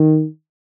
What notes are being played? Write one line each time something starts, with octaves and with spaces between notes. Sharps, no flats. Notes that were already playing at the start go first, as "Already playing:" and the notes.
Already playing: D#3